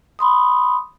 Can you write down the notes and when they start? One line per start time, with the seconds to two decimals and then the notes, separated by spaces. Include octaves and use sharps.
0.19 B5 C6 D#6